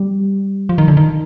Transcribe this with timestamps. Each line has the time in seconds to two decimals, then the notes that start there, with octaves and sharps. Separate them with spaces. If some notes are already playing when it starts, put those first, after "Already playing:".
Already playing: G3
0.69 F3
0.78 D#3
0.88 D3
0.97 D#3